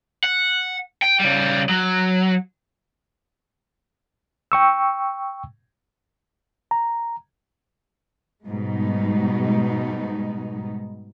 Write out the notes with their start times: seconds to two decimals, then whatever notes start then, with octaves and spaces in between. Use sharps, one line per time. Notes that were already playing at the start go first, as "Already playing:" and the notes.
0.23 F#5
1.02 G5
1.20 C#3 G3
1.69 F#3
4.52 G5 C#6 E6
6.71 A#5
8.47 G#2 B2 G3 G#3 B3 D#4